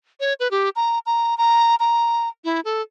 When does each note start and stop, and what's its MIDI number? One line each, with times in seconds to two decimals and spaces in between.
0.20 0.33 73
0.40 0.50 71
0.51 0.69 67
0.76 0.99 82
1.06 1.37 82
1.38 1.75 82
1.80 2.28 82
2.44 2.60 64
2.65 2.82 69